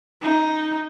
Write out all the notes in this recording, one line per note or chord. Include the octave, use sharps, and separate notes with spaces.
D#4